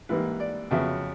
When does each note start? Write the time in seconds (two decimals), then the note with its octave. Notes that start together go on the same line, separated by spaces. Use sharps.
0.09 G#2 E3 G3 A#3 B4
0.40 D5
0.71 F2 C#3 F#3 B3 E5